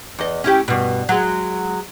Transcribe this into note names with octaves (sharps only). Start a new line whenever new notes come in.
E2 D#5
C#4 E4 G4
G2 B2
F#3 G#3